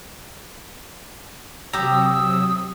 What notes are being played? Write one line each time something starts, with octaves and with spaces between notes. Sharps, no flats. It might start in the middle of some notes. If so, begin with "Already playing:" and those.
C3 F#3 G4 A#5 D#6 E6